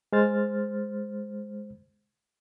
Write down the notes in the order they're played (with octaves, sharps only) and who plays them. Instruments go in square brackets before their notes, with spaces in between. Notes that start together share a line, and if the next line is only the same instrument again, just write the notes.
[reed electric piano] G#3 C5 F6 A6